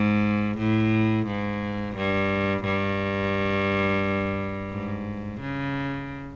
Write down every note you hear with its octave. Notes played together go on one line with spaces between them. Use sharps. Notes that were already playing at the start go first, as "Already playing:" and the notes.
Already playing: G#2
A2
G#2
G2
G2
G#2
C#3